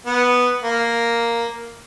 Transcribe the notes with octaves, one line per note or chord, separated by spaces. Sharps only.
B3
A#3